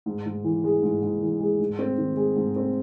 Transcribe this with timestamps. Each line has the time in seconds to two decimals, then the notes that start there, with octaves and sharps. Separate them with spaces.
0.06 G#2
0.26 G#2
0.44 E3
0.64 G#3
0.83 G#2
1.02 G#2
1.22 E3
1.40 G#3
1.59 G#2
1.79 C4
1.98 D#3
2.17 G#3
2.36 G#2
2.56 C4